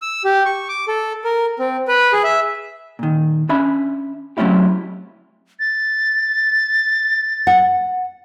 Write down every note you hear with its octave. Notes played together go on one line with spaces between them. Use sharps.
E6
G4
C#6
D6
A4
A#4
C4
B4
G#4
E5
A#2 D#3
C#4 D4 E5 B5
F#3 A3 C4 C#4 E4 G4
A6
F#5